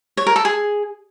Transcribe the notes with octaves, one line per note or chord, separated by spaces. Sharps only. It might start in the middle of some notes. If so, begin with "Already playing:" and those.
C#5
A#4
A4
G#4